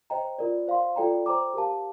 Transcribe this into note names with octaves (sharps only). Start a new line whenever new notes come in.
C5 D#5 G5 A#5
F4 A#4 D5
C5 F5 C6
F4 A4 D5 G5 A#5
C5 G5 A#5 D6
G4 A#4 F5 A5